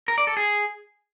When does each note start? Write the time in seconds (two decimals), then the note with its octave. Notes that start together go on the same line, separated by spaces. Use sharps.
0.08 A#4
0.18 D5
0.27 A4
0.37 G#4